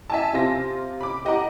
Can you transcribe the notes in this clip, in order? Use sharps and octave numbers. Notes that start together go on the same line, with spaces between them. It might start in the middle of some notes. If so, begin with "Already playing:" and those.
E5 G#5 A5
C3 C4 F4 A#6
B5 D6
G4 D#5 F#5 A#5 D6